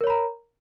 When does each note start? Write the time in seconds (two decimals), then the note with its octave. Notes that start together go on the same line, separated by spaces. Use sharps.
0.01 A#4
0.04 C#5
0.07 B5
0.10 A#5